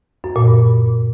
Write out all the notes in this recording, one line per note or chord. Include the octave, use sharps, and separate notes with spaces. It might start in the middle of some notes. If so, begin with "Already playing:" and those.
F#2
A#2
G2